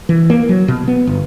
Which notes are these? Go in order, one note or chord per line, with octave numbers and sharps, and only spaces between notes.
E3
A#3
F#3
B2
B3
G1